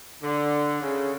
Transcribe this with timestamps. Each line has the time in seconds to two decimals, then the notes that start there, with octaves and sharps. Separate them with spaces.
0.23 D3
0.81 C#3